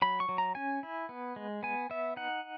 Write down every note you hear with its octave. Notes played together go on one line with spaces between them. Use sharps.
F#3 B5
C#6
F#3
A#5
C#4 G#5
E4
B3
G#3
B3 G#5
B3 E5
D#4 F#5